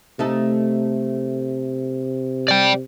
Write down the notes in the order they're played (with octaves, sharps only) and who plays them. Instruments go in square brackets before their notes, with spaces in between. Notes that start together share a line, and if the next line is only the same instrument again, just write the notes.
[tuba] C3 [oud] A3 D#4 A4
[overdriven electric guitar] D5 G5